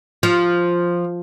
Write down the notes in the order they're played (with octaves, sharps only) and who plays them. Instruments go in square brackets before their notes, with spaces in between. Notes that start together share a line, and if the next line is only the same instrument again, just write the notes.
[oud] F3